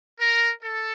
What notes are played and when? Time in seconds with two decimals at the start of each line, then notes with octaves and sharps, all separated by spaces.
0.19 A#4
0.63 A4